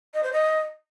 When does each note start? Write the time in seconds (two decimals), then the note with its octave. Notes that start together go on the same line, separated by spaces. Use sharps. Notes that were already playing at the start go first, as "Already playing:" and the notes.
0.14 D#5
0.23 C5
0.33 D#5